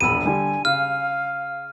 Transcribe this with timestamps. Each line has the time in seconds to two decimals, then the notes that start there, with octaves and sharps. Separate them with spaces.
0.01 E1 A#1 B5 E6 D#7
0.25 D3 G3 G#5
0.65 C#3 F5 F6